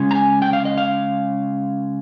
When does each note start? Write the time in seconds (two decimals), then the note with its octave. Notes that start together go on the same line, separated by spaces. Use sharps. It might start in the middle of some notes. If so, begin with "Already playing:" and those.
Already playing: C#3 G#3 C#4
0.11 A#5
0.15 G#5
0.42 G5
0.53 F5
0.65 D#5
0.78 F5